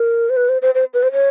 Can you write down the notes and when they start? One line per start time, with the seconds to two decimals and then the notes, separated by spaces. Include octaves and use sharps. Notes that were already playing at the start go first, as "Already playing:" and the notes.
Already playing: A#4
0.30 C5
0.37 B4
0.49 C5
0.62 C5
0.75 C5
0.94 B4
1.03 C5
1.13 C#5